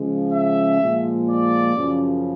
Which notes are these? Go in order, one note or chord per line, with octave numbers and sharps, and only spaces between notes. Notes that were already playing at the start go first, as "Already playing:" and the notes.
Already playing: C#3 F3 G#3
E5
A#2 F3 G#3
D5
F#2 C#3 F3